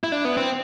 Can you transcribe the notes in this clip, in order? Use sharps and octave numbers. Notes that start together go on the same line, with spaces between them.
E4
D4
B3
C4